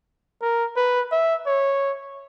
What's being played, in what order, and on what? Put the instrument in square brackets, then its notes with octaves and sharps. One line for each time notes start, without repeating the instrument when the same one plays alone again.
[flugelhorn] A#4
B4
E5
C#5